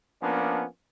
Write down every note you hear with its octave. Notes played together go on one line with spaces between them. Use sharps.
F3 A#3 B3 C#4 D4